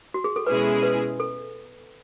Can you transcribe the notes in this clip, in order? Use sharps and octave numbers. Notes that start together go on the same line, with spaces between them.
F#4
G#4
A4
B2 G#3 C#4 E4 G#4 B4
B4
A4